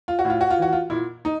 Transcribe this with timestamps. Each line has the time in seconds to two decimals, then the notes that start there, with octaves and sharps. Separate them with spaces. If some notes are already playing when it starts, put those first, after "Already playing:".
0.08 F4
0.19 F#4
0.25 A2
0.30 F4
0.41 F#4
0.50 F4
0.58 E3 F#4
0.73 F4
0.90 A#2 E4
1.25 D#4